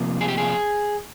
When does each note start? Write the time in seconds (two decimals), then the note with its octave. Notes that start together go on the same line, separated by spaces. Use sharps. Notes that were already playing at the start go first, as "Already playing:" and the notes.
Already playing: C3 F3 A#3
0.21 G#4
0.28 G4
0.38 G#4